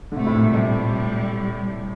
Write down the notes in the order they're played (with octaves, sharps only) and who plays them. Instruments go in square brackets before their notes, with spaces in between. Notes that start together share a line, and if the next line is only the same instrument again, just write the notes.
[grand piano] D3
[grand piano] C3 [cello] A3
[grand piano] A2
A#2
C3
[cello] G3 [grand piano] A3